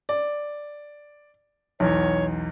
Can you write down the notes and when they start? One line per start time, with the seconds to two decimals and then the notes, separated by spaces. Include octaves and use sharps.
0.09 D5
1.80 B1 E2 C#5